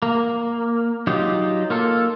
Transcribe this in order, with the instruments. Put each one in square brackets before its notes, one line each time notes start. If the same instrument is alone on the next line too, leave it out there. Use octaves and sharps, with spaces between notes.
[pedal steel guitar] A#3
F#3 D#4 F4 G4
A#3 F4 A4